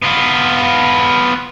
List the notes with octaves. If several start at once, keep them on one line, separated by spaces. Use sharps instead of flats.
B3 F4